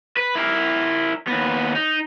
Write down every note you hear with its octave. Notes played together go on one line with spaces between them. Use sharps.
B4
E4 A#4
D#2 B3
D#4